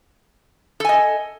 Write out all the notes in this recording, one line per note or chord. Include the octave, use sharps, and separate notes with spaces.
A4 D#5 G#5